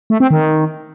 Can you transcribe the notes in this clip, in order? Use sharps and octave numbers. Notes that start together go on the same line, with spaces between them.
A3
C4
D#3